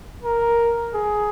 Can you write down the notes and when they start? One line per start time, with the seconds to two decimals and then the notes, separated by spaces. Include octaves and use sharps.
0.24 A#4
0.94 G#4